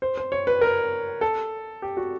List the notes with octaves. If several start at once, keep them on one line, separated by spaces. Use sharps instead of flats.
C5
C5
C#5
B4
A#4
A4
G4
F#4